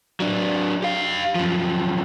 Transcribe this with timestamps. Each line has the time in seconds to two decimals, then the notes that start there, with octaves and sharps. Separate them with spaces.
0.20 F#3 D4
0.82 G4 F5
1.35 F#2 F3